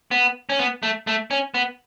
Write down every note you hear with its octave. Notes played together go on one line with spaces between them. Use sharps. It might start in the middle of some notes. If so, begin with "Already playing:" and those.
B3
C#4
B3
A3
A3
C#4
B3